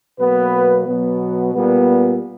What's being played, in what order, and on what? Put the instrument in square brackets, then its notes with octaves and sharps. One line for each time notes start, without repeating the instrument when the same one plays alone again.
[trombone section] B2 F#3 A#3 B3 B4
B2 F#3 B3
A#2 G3 B3